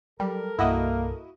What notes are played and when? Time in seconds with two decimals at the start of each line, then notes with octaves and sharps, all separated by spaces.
0.20 F#3 G3 A4 A#4
0.59 C2 G2 A#3 E4 F#4 D#5